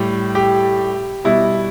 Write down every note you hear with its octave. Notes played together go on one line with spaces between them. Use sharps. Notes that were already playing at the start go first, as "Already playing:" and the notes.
Already playing: A2 G3 G4
G4
B2 G3 E4